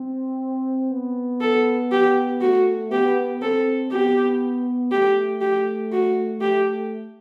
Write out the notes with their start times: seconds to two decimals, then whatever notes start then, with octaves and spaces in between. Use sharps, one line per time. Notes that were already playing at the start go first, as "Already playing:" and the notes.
Already playing: C4
0.91 B3
1.41 A4
1.92 G4
2.41 A3 F#4
2.91 B3 G4
3.42 C4 A4
3.91 B3 G4
4.92 A3 G4
5.41 G4
5.92 F#4
6.41 A3 G4